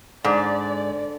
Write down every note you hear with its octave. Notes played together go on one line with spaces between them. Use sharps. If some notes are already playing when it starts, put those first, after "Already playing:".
G#2 D3 D5